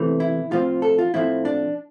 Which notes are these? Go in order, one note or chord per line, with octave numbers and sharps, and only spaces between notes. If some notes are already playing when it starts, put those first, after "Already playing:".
Already playing: E2 C3 E3 A3
E4
A2 F3 C4 F4
A4
F4
A2 F3 A3 C4 E4
D4